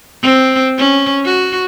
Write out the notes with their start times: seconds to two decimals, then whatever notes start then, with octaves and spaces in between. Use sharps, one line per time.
0.23 C4
0.78 C#4
1.25 F#4